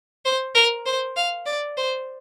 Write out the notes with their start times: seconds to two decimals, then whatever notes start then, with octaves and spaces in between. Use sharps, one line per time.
0.25 C5
0.55 A#4
0.86 C5
1.16 F5
1.46 D5
1.77 C5